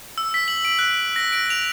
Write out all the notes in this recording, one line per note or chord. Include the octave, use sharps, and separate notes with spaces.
E6
B6
F#7
D7
F#6
A#6
D7
F7